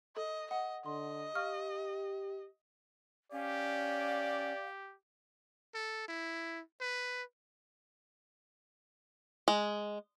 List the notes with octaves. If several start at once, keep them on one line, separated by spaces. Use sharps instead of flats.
A4 D#5
D#5 F#5
D3 D#5 C6
G4 F5 C#6 F6
C#4 G4 D5 F5
A4
E4
B4
G#3